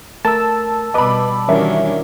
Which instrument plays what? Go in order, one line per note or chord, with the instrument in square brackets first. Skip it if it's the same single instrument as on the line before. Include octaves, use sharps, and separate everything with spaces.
[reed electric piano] A3 A#4 [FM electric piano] A5 E6
[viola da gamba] B2 G3 [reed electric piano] B4 D#5 [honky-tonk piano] B5 D6
[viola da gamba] D#3 D4 F#4 [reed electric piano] E3 G3 [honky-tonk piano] C#4 E4 A#4